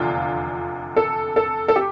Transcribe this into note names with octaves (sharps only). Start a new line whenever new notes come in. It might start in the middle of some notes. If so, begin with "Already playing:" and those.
Already playing: F1 E2 D3 F4
A4
A4
A4
G4